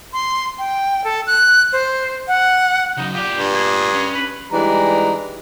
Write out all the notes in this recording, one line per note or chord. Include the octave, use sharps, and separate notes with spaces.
C6
G5
A4
F#6
C5
F#5
C#3 F#3 D#4
F4 G4 D5
G2
G#4
C#4
B4
E3 G3 G#3 D4 D#4 A#5